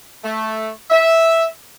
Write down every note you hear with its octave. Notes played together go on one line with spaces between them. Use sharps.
A3
E5